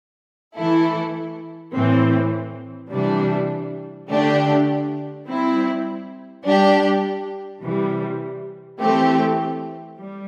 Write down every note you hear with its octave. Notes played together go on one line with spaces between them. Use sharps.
E3 A3 E4 A4
A2 E3 C4
C3 E3 G3 D4
D3 A3 D4 G4
G3 C4 E4
G3 D4 G4
C3 E3 G3
E3 A3 C4 G4
G3